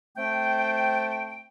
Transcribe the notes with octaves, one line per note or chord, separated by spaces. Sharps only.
A3 C4 C5 G5